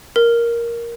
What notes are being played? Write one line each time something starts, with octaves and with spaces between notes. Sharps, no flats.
A#4